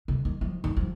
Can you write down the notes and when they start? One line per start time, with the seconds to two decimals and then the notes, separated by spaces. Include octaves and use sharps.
0.08 C3
0.25 D#3
0.41 F3
0.64 D#3
0.77 F3